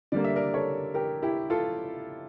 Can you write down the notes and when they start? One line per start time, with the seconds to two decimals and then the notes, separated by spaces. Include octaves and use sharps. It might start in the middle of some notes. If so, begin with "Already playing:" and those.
0.12 D3 G3 A#3 D5
0.24 E5
0.36 A#4 D5
0.54 A4 C#5
0.94 G4 A#4
1.22 E4 G4
1.50 F4 A4